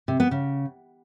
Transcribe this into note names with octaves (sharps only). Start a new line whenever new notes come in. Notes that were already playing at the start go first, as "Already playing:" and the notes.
C3
B3
C#3